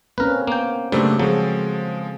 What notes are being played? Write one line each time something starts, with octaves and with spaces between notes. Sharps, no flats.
A#3 C4 C#4 A#4 B4
A#3 B3 G5
F#2 C#3 G3 A3 A#3 D4 C5
F3 F#3 G#3 C4 G#4 A4